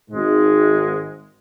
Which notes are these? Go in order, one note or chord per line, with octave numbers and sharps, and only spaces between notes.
G#1 G#2 G#3